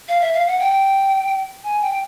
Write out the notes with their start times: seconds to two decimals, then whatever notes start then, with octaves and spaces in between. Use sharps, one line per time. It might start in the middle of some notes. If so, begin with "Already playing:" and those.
0.09 F5
0.21 E5
0.33 F5
0.47 F#5
0.59 G5
1.64 G#5
1.82 G5